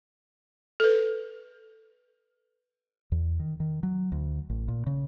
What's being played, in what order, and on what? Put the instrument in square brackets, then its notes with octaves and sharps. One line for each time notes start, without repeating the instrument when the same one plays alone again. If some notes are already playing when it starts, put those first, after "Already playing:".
[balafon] A4 B4
[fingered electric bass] E2
D#3
D#3
F#3
D2
A1
A#2
C#3